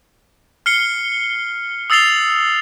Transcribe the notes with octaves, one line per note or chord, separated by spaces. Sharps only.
F6 C7 C#7 G7
D#6 E6 A6 C7 F7 G7